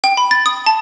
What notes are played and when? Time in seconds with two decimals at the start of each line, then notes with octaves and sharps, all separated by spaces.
0.04 G5
0.17 B5
0.31 A6
0.46 D#6
0.66 A5